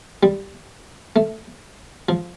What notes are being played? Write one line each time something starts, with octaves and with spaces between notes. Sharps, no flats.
G3
A3
F3